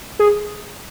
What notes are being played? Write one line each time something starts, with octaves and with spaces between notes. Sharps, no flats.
G#4